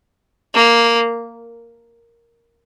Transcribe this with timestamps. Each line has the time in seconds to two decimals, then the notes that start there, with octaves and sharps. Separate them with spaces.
0.55 A#3